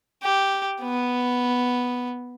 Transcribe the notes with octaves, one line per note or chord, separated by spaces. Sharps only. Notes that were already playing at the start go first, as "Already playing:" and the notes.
G4
B3